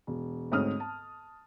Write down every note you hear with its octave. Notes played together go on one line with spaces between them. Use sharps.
E1
D2 G#2 C4 C#5 D#6 F6
A5